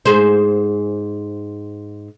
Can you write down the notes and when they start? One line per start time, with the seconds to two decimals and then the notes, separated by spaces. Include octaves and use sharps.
0.06 G#2 G#4 C5